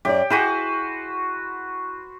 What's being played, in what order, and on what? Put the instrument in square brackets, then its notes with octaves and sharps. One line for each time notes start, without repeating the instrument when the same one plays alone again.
[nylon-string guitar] F#2 D5 [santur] G4
[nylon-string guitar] E4 G#4 [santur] F#4 B4 C5